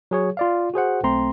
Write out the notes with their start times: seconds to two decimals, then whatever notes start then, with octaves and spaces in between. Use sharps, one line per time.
0.11 F#3 G#4 C#5
0.37 F4 D5 F5
0.74 F#4 G#4 C5 F#5
1.03 B1 A3 C4 A#5 C6